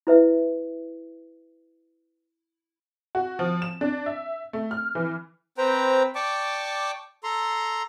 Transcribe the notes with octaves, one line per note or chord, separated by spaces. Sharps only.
E4 B4 E5
F#4
F3
E7
D4
E5
A3
F6
E3
C4 B4 C5 G5 A#5
D5 G5 A5 C#6 D6
A4 A#5 C6